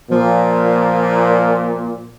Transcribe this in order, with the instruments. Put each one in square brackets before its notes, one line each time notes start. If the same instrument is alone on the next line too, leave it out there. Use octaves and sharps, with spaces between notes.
[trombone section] A#2 [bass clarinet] F3